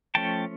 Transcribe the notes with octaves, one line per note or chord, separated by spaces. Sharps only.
F3 A3 C#4 G5 A5